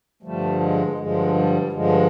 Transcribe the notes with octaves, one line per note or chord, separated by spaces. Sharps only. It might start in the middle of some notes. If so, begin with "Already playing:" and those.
G2 D3 F3 G3 A3
G#3
G2 D3 F3 G#3
G3
G2 D3 F3 G#3